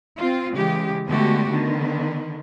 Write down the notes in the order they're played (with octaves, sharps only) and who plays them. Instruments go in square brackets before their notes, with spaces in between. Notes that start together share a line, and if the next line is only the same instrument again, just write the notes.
[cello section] C4 F4
C#3 E3 G#3 G4
D3 G#3 A3 B3 F#4 G4
D3 D#3 B3